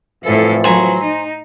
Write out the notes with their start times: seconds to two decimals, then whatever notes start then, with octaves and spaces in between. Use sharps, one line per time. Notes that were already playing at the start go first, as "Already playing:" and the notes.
0.24 C2 A2 E3 F3 A4
0.64 F#3 C5 G#5 A#5
1.03 D#4